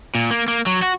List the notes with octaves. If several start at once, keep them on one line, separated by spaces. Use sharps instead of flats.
A#2
A#3
A#3
F#3
F#4